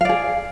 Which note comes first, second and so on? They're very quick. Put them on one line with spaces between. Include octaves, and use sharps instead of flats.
F5 D5 G#4